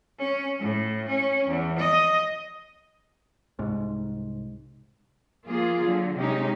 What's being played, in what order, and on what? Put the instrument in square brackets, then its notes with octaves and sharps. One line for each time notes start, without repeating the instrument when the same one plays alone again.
[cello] C#4
A2
C#4
E2
D#5
[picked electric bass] C2 G#2
[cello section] F3 A#3 F4 G#4
D3 F#3
C3 G#3 C#4 D#4 G4